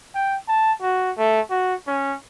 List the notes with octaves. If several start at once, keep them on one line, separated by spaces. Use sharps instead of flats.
G5
A5
F#4
A3
F#4
C#4